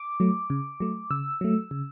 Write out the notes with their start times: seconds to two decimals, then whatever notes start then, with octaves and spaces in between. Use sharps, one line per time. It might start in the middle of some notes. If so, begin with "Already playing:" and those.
Already playing: D6
0.20 F#3 A3
0.50 C#3
0.80 F#3 A3
1.11 C#3 E6
1.41 F#3 A3
1.71 C#3